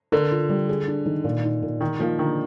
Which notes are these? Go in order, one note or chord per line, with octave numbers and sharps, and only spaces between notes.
D3 A#4
F4
G3
G#4
D4
D#3
A#2
D#4
A#2
D#3 D#4
F3 A#3
D3 D#3